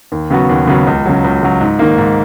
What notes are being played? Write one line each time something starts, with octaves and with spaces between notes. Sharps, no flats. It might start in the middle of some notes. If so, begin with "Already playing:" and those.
D#2
C#3 F#3 B3 F#4
D#2
C#3 F#3 B3 F#4
C#2
C#3 F#3
C#2
C#3 F#3
G#2
D#3 A#3
G#2